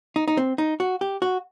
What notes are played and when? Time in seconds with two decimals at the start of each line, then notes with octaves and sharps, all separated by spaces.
0.16 D#4
0.28 D#4
0.37 C4
0.58 D#4
0.80 F#4
1.01 G4
1.22 F#4